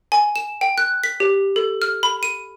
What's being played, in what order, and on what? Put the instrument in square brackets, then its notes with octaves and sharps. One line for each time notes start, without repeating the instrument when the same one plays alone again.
[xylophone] G#5
E7
G5
F#6
B6
G4
A4
F6
B5
D#7